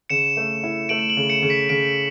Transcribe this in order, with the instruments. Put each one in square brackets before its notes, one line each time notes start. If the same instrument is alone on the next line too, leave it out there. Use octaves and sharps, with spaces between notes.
[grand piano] C#3 [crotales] C#7 E7
[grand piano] A3
E4
[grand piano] A3 [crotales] D7 F#7
[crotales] E7
D7 F#7
[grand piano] C#3
[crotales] C#7 E7
[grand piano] C#3
[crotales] B6 D7
[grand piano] C#3 [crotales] B6 D7